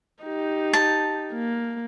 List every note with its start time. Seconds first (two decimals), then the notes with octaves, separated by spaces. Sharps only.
0.24 D#4 G4
0.73 A5
1.33 A#3